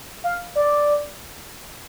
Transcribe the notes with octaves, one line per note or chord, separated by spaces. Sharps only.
F5
D5